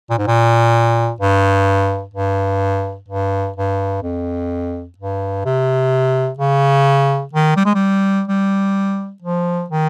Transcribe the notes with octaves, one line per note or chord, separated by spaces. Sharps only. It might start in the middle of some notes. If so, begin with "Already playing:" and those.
A#2
G#2
A#2
G2
G2
G2
G2
F2
G2
C3
C#3
D#3
G3
G#3
G3
G3
F3
D#3